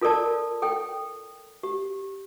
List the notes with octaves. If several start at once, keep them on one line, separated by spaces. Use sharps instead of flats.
F4 A4 A#4 D5 A5
A4 G5
G4